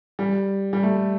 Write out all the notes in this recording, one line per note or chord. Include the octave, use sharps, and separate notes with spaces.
G3
G3
A3